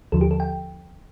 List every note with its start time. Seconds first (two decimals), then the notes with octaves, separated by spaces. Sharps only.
0.12 D#2 D3 F3 A4
0.21 G4
0.31 A4
0.40 G5